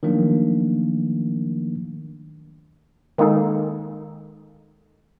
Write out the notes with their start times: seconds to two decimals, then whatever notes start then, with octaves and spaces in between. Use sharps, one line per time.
0.03 D#3 F3 F#3 A3 A#3 D4
3.18 D#3 G#3 A#3 D#4 G#4 A4